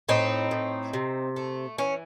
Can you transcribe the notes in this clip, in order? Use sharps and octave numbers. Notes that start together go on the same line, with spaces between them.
A2 C4 D#4
A2
C3
A3
E3 C#4